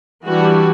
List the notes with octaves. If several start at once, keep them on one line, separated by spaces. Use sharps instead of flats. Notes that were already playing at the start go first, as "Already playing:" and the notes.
E3 G3 D4 F#4